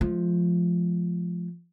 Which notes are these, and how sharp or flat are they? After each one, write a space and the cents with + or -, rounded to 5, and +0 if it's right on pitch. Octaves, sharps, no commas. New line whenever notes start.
F3 +0 G#3 +45